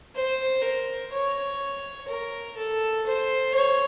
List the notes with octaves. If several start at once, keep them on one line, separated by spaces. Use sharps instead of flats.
C5
A#4
C#5
A#4
A4
C5
C#5